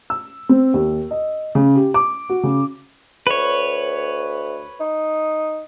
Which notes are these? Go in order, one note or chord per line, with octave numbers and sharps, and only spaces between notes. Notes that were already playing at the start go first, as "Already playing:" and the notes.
E6
C4
D#2
D#5
C#3
G4
D6
F#4
C#3
D2 B4 C#5
D#4